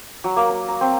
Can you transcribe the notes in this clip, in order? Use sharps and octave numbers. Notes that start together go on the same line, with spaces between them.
F#3
A#3
A#5
A#5
C4